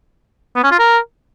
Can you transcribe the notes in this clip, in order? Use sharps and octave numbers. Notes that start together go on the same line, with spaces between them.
B3
C#4
F4
A#4